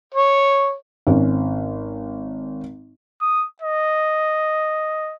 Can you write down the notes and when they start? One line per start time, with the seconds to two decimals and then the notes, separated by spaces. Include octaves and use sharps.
0.14 C#5
1.07 G#1 C#4
3.21 D#6
3.62 D#5